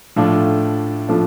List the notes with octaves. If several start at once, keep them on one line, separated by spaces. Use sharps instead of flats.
A2 F3 A3 D4 F4
A2 F3 A3 D4 F4